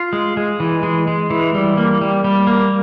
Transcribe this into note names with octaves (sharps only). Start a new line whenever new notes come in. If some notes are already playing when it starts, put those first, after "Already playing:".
Already playing: F4
G#3
G#3
E3
G#3
G#3
E3
G3
A#3
G3
G3
A#3